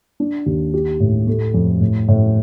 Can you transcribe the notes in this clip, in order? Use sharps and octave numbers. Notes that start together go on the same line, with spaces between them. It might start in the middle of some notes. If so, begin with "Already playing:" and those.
D4
D#2
G4
A2
A3
F2
A2
A2